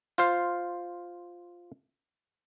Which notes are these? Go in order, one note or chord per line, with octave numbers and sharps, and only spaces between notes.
F4 C5 F5